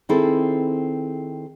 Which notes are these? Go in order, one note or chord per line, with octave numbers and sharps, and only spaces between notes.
D#3 C4 E4 G#4 A4